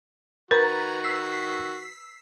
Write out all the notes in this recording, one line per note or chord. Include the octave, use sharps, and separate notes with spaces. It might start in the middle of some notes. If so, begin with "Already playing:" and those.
D#3 F#4 A#4 B4 A#5 G#6 A6
E6 B6 C7